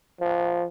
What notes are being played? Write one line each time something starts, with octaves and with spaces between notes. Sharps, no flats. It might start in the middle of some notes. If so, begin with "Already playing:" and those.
F3